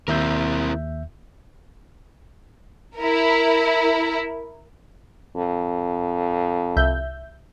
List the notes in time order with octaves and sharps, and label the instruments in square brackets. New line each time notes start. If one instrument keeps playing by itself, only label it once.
[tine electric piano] D#2 E5 G6 [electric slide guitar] C4 E4 A#4
[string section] E4 A#4
[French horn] F2
[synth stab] C2 E5 G6